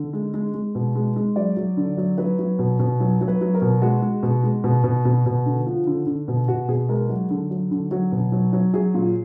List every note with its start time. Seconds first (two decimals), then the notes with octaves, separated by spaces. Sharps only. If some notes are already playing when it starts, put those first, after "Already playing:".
Already playing: D3
0.13 G#3
0.34 G#3
0.54 G#3
0.75 B2
0.95 G#3
1.16 G#3
1.36 F#3 D5
1.57 F#3
1.77 D3
1.97 F#3
2.18 F#3 B4
2.39 F#3
2.59 B2
2.79 B2
3.00 F#3
3.21 F#3
3.28 B4
3.41 F#3
3.54 A#4
3.62 B2
3.82 G#3 F#4
4.02 G#3
4.23 B2
4.43 G#3
4.64 B2
4.84 B2
5.05 B2
5.26 B2
5.46 D3
5.66 F3
5.87 D3
6.07 D3
6.28 B2
6.48 B2 F#4
6.68 B2 G#4
6.89 G#3 A#4
7.09 F#3 F#4
7.30 D3
7.51 F#3
7.71 D3
7.91 F#3 F#4
8.12 B2
8.32 F#3
8.53 F#3
8.74 F#3 G#4
8.94 A#2